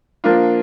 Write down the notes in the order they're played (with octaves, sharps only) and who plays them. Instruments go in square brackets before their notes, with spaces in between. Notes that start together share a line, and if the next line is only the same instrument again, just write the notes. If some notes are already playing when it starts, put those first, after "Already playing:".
[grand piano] F3 A#3 D4 F4